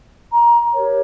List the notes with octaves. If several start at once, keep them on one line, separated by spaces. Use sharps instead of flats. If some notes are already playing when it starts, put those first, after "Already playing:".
A#5
G4 A#4 C#5